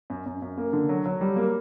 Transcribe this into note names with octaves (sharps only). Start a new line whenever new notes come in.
F#2
F#2
F#2
A#3
D3
F#3
F#3
G3
A#3